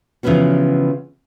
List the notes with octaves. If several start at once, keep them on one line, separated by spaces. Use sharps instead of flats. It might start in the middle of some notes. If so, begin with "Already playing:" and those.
C#3 E3 F3 B3 C#4 F#4